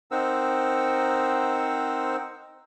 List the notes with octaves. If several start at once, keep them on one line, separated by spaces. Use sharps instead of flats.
C4 D#4 A#4 C5 F#5 E6